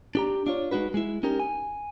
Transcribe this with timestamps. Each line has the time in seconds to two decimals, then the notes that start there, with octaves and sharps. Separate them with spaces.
0.15 D4 G4 A#5
0.47 D4 F4 C#5
0.71 G#3 D#4 F#4 B4
0.94 G#3 E4
1.23 C#4 D#4 G4 A#4
1.40 G#5